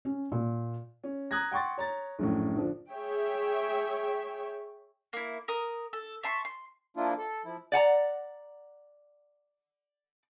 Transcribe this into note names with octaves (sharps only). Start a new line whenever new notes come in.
C#4
A#2
C#4
A#5 D#6 F#6 G#6 A#6
F#5 G5 C6 C#6 A6
C#5 A#5 A6
A#1 F#2 A2
D3 F3 D4
G#4 C#5 E5 G5
A#3 E4
A#4 D#6
A4
E5 A5 C6 C#6
C6
F3 A#3 D4 E4 F4
A4
F3 E4
D5 F#5 A5 A#5